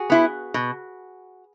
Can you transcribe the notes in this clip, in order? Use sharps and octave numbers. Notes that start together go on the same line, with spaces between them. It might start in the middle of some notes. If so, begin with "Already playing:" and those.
Already playing: F#4 G#4
B3 E4
B2